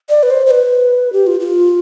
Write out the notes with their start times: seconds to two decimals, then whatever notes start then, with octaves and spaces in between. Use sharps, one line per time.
0.09 D5
0.23 B4
0.30 C5
0.46 C5
0.51 B4
1.13 G4
1.27 F4
1.40 F4